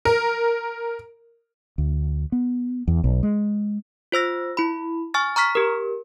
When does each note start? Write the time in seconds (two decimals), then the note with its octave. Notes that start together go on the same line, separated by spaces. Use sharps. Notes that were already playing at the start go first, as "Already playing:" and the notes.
0.05 A#4
1.78 D2
2.32 B3
2.88 E2
3.04 B1
3.23 G#3
4.12 F4 C5 E6 A#6
4.57 E4 B5
5.14 G#5 C#6 F6 A6
5.36 A#5 C#6 F6 B6
5.55 G4 A#4